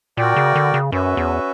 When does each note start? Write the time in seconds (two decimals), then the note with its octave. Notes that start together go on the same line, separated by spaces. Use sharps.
0.17 A#2 F#4 A#4 D5 G5
0.36 C#3
0.55 D3
0.74 C#3
0.92 F#2 C#4 F#4 B4 E5
1.17 E2